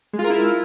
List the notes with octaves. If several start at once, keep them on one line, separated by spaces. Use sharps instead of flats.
G#3
F4
A#4
E4